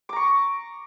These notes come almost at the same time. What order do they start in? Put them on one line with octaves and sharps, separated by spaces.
D6 A#5 C#6